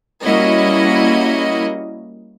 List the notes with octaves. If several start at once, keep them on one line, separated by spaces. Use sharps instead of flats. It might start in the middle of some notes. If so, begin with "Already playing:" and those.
G3 A#3 C#4 E4 F#4 D#5